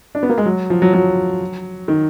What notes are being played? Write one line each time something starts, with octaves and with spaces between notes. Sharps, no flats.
D4
B3
A#3
G#3
F#3
F3
F#3
F#3
D#3